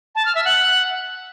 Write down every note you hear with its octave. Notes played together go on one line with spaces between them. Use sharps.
A5
F6
E5
F#5